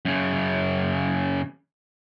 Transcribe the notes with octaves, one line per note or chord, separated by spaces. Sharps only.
F#2 C#3